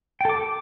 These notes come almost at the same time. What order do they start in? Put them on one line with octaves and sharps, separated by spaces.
G5 A4 D6